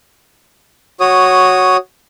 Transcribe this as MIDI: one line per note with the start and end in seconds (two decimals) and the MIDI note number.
1.00 1.77 66
1.00 1.77 73
1.00 1.77 87